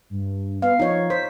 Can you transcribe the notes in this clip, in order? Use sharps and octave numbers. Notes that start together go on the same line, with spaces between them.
G2
B3 F5
F3 D#4 C#5
C5 B6